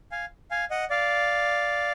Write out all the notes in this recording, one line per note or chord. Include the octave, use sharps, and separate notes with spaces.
F5 G#5
F5 G#5
D#5 F#5
D5 F5